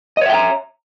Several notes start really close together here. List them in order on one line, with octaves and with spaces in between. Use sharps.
D#5 C#5 E5 G5 A#5